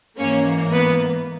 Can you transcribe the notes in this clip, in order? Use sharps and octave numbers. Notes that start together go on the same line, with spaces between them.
G#2 E3 A#3 C#4 C#5
B3 B4